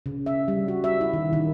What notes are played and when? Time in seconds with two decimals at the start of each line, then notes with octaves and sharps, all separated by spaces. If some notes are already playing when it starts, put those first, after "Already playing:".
0.06 C#3
0.26 E5
0.48 G3
0.68 F#4
0.84 E5
1.01 E4
1.13 D#3
1.33 D#3